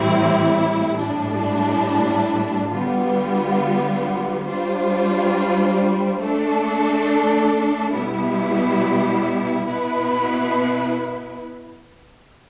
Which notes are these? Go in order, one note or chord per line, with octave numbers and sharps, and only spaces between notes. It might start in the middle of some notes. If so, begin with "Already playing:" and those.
Already playing: A2 E3 G3 C4 E4
A2 G3 D4
D3 G3 B3 F4
G3 D4 F4 C5
A3 D4 A4
B2 G3 B3 E4
B2 B3 E4 B4